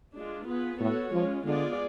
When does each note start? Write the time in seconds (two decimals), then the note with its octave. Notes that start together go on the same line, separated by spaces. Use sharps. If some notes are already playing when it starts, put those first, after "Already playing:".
0.15 G#3 D4 F4
0.47 B3 F4 G#4 B4
0.80 A2 B3 F#4 A4 C#5
1.13 F3 G#3 C#4 F4
1.45 D3 G#3 B3 F4 G#4 D5